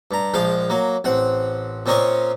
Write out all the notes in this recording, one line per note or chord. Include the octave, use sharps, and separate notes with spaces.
G2 A#5
A#1 F3 G#3 F5
F#3 A#3
A1 C4 F#5
A#2 C4 C#4 A#4 D#5 C#6